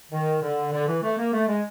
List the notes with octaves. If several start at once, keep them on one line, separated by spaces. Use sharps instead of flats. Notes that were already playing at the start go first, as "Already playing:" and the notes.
D#3
D3
D3
E3
A3
A#3
A3
G#3